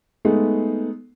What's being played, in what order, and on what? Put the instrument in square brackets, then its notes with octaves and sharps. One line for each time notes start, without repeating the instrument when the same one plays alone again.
[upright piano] G#3 A3 B3 D#4